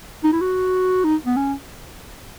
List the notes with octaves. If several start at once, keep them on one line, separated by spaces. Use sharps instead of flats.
D#4
E4
F#4
D#4
B3
C#4